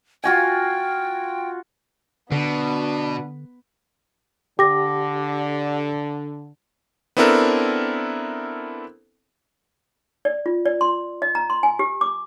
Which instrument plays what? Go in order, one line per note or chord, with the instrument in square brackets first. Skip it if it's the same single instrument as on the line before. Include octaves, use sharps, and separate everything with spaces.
[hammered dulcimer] F4 F#4 G#5 [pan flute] G5
[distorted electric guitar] B2 [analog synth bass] D3 [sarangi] B3 [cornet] D4
[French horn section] D3 [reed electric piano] G4 [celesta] D6 A#6
[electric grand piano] B3 C4 D4 E4 A4 A#4
[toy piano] D5
F4
D5
C6
D#5
A#5
C6
G#5
G4
D6